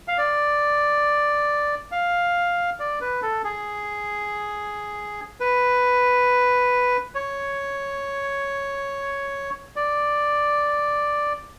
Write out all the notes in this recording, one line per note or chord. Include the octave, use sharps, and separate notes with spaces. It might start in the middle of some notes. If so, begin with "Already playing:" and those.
F5
D5
F5
D5
B4
A4
G#4
B4
C#5
D5